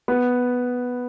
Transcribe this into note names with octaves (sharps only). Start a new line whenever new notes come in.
B3